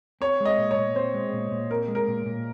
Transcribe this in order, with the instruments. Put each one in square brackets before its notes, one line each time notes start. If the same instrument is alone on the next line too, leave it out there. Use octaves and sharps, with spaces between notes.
[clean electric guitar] C4 [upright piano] C#5
[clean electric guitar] G#3
[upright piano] D#5
[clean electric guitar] A#2
[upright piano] C#5
[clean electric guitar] A#2
[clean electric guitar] C4 [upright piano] C5
[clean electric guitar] G#3
A#2
A#2
[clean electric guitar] C4 [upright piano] A#4
[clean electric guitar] G#3
[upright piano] A#4
[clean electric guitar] A#2
A#2